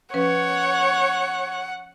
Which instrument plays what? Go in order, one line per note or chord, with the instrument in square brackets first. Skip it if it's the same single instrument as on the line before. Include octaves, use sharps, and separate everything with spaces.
[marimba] F3 C#4 B4 [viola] C#5 [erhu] F#5